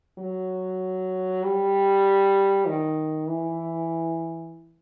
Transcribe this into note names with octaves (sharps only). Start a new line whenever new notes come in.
F#3
G3
D#3
E3